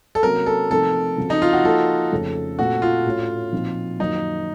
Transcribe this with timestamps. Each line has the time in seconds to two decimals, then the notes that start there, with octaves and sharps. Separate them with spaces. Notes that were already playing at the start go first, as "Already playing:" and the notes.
0.15 A4
0.23 C3 F#3 A#3 C#4 F#4 A#4
0.46 A4
0.70 C3 F3 A3 C4 D#4 A4
1.18 C#3 F3 C4 F#4
1.30 D#4
1.42 F4
1.53 F#4
1.64 F3 A#3 F4 A4
2.12 F2 C#3 A3 C#4
2.59 A#2 A3 C4 F4 F#4
2.82 F4
3.05 A2 A3 C#4 F#4
3.52 A#2 F3 C4 D#4
3.99 F#2 D#3 A#3 D#4 F4